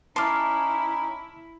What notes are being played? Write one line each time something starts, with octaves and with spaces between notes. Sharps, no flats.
C#4 D#4 E4 A5 C6 D6 F6